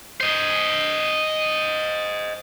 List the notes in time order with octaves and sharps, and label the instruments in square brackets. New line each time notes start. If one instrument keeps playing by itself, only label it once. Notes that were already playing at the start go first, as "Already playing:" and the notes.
[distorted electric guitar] C5 D#5